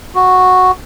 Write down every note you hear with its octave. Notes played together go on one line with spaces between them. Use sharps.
F#4